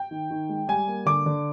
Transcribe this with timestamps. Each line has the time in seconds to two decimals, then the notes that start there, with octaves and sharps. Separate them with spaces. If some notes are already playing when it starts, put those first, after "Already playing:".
Already playing: G5
0.11 D#3
0.31 D#3
0.49 G#3
0.68 G3 G#5
0.88 A#3
1.06 D3 D6
1.26 D3